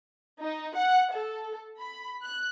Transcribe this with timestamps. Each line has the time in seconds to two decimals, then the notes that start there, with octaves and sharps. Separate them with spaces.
0.41 D#4
0.75 F#5
1.14 A4
1.79 B5
2.21 F#6